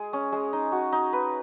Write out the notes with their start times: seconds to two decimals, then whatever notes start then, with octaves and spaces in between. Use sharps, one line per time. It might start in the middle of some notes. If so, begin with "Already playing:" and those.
Already playing: G#3 G#4
0.13 C#4
0.32 G#3
0.53 D#4
0.72 F#4
0.92 D#4
1.13 B4